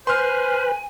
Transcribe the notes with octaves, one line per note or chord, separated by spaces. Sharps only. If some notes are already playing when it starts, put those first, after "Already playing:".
B4 C5 G#5 C6 F6